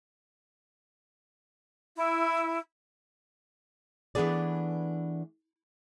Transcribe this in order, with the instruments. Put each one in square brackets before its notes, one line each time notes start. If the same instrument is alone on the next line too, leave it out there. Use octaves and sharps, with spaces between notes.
[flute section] E4
[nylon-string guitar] E3 A3 B3 D4 G#4 D5